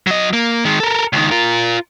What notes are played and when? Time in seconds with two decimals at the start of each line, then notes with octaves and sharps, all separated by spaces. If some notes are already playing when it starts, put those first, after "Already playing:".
0.07 F#3 D#5
0.33 A#3
0.65 D#3 G#3
0.80 A4 A#4
1.13 C#2 D#3
1.31 F4 A#4